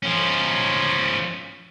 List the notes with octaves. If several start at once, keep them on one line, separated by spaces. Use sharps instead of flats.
F3 C#4